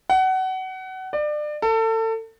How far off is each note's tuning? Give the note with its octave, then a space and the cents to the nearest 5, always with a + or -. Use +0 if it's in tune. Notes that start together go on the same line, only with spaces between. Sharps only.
F#5 +25
D5 +30
A4 +30